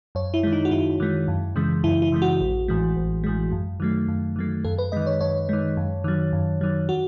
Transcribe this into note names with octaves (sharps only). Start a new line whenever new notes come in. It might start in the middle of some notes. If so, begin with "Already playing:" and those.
F#2 C#5
E4
D#3 G#3
D#4
F#4
F#2 E4
D#3 G#3
F#2
C#3 E3 G#3
F#2 E4
E4
C#3 E3 G#3
F#4
A1
A2 E3 G#3
A1
A2 E3 G#3
F#2
D#3 F#3 A3
F#2
D#3 F#3 A3
F#2 A4
B4
D#3 G#3 D#5
C#5
F#2 C#5
D#3 G#3
F#2
D#3 F#3
F#2
D#3 F#3
F#4